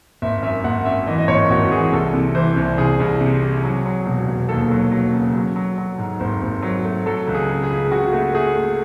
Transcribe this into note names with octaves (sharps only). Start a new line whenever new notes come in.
G#1 E5
F#2 E5
G#1 F#5
F#2 E5
E3 D#5
D#5
G#1 C#5
G#1 F#4
E3 G#4
C2 A4
C3
E3 C5
C2
C2 G#4
C2
C3
C3
F#3
F#3
E1
E1
D#2 A4
F#3
F#3
C#3
F#3
F#3
F#3
G#2
G#1 C5
G#1
F#3
A3
F#3 A4
C#2
G#4
C#3
G#4
C#2
C#3 F#4
A3
A3 G#4
A3